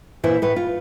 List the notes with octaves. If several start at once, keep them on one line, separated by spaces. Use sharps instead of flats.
A#2 E3 E4 C5 E5
A2 B4
F4